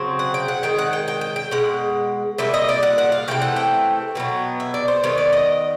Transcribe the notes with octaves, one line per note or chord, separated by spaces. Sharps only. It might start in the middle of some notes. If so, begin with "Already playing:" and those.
Already playing: C#3 F#3 C4
F#5
G5
F#5
D#3 G#3 G5
F#5
G5
G5
G5
G5
B2 G#3 F#5
A#2 G3 E5
D#5
D5
F#5
F#5
F5
C3 E3 A3 G5
F#5
G5
B2 F#3 B3
E5
D5
C5
D#3 G3 B3 C#5
D5
D#5